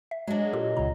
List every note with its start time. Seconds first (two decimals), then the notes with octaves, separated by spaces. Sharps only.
0.11 E5
0.28 F#3 G#3 D4 D#5
0.53 A#2 F4 G4 A4
0.77 C#2 C#3 A#5